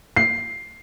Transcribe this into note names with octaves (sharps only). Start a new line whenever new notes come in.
C7